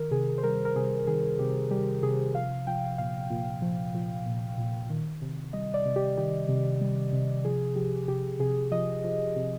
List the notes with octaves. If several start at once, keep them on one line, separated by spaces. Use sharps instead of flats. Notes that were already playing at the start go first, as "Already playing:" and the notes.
Already playing: D#3 A#4
C3 G#4
C5
G3 A#4
A#4
C3 G#4
D#3 G#4
C3 G4
G3 G4
C3 G#4
F3 F5
F3 G5
A#2 F5
A#2
F3
F3
A#2
A#2
D#3
C3
G3 D#5
D5
C3
G4
D#3 G4
C3
G3
C3
F3 G#4
F3 G4
C3 G4
C3 G#4
F3 D#5
F3
C3